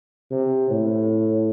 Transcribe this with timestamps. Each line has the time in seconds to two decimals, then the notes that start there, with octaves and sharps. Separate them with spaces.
0.31 C3
0.70 A2